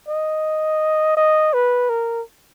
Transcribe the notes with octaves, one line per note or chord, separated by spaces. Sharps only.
D#5
D#5
B4
A#4